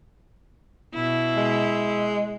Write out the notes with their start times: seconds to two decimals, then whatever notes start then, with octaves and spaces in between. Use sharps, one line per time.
0.94 B2 E4
1.37 G#3